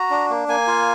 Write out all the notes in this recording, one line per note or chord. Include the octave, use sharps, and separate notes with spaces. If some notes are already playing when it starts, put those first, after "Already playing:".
Already playing: F#4 A#5
D4
A#3
A#3 G#5
F4